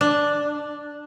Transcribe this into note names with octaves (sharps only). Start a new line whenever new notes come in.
D4